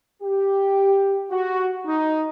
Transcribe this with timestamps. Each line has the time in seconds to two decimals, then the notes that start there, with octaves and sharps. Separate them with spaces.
0.22 G4
1.31 F#4
1.85 D#4